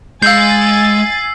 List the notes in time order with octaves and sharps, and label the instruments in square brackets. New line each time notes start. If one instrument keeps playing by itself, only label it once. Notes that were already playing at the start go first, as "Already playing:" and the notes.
[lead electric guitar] G#3 [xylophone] F5 G6 [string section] G#5 A6 [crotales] E6 C7